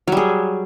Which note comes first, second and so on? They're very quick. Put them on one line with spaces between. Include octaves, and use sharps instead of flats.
F#3 G3 G#4